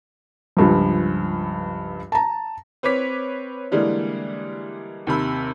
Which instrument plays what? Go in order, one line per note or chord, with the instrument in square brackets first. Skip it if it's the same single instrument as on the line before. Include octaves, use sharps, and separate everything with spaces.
[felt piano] C#2 G2 F3
A5 A#5
[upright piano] C4 B4 C#5 D6 B6
D3 E3 G3 G#3 A#3
D#2 C3 B5 E6